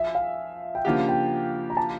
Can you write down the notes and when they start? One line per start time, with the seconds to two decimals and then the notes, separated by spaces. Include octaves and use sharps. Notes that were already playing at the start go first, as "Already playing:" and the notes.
Already playing: F3 G#4 E5
0.15 F5
0.75 G5
0.85 C#3 F3 A#3 D4 G4 F#5
1.09 G5
1.70 A#5
1.77 A5